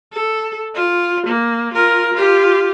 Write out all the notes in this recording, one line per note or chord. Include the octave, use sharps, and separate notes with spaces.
A4
F4
A#3
F4 A#4
F4 G4